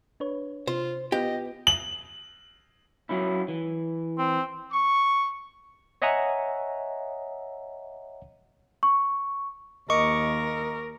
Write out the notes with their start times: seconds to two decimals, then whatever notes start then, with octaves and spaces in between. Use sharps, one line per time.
0.20 D4 B4 C#5
0.67 C3 F4 C5
1.12 B3 F4 G4 B4 D#5 G5
1.67 F#7
3.09 F#3 C#4 E4
3.48 E3
4.18 C4
4.71 C#6
6.02 C#5 D#5 E5 F#5 G#5 A#5
8.83 C#6
9.90 D#2 A#4 D#5 C#6 D6 C#7